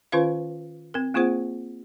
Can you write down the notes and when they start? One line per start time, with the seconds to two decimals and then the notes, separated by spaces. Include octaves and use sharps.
0.12 D#3 C#4 F4 B4 C5 F5
0.94 C4 A#4
1.14 A#3 C4 F4 G#4 C5 F#5